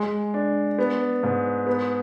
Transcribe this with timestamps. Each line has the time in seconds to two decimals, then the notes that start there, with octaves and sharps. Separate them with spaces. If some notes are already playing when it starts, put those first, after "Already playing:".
Already playing: G#3
0.34 D4
0.79 B3
1.23 G#2
1.67 B3